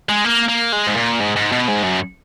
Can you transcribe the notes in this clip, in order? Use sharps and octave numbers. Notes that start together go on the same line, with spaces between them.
G#3
A#3
A#3
G#3
G#2
A#2
G#2
G#2
B2
G#2
F#2